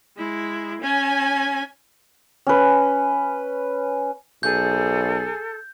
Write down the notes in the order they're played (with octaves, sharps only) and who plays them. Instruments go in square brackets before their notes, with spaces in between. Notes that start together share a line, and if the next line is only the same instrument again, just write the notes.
[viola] G#3 E4
C#4 G#5
[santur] C#4 B4
[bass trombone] B1 [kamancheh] G#4 [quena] A4 [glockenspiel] G6